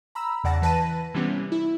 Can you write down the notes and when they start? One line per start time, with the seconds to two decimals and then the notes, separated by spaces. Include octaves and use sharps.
0.15 A#5 B5 E6
0.44 E2 C#3 D5 F#5 A5 A#6
0.62 E3 B4 A5 A#6 D#7
1.14 C3 E3 G3 B3 C#4
1.52 E4